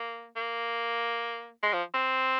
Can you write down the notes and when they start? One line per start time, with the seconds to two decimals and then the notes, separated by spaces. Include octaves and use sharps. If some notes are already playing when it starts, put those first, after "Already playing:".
Already playing: A#3
0.37 A#3
1.63 G#3
1.73 F3
1.94 C4